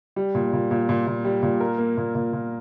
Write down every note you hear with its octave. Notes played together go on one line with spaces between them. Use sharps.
G3
A#2
A#2
A#2
A#2
A#2
G3
A#2
A#4
A#3
A#2
A#2
A#2